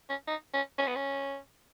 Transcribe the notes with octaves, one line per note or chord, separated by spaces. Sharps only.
C#4
D#4
C#4
C#4
B3
C#4